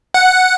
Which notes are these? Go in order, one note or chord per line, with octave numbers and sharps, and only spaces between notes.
F#5